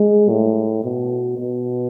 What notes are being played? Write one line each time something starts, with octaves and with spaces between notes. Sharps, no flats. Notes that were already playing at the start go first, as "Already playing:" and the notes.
Already playing: G#3
A2
B2
B2